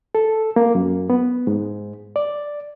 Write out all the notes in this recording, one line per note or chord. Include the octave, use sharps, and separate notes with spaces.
A4
A#3
F#2
B3
G#2
D5